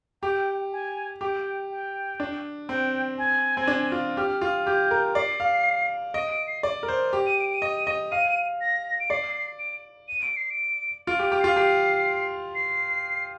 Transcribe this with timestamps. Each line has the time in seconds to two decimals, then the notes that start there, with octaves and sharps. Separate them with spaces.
0.22 G4 G5
0.72 G#5
1.21 G4 G5
1.71 G5
2.20 D4
2.69 C4 G5
3.18 G#5
3.57 C4
3.68 D4
3.92 F4
4.17 G4 F6
4.42 F4
4.66 G4 G6
4.91 A#4
5.15 D5 C7
5.40 F5
6.14 D#5 D7
6.31 D7
6.47 C7
6.63 D5
6.83 A#4
6.88 C5
7.13 G4
7.26 D#7
7.40 D7
7.54 D#7
7.62 D#5
7.87 D#5
8.11 F5 D#7
8.28 D#7
8.61 A#6
9.00 D7
9.10 D5 C7
9.59 D7
10.08 D#7
10.22 D7
10.36 C7
10.50 D7
11.07 F4 D7
11.19 G4
11.24 D7
11.32 G4
11.40 F4 C7
11.56 G4 C7
12.55 C7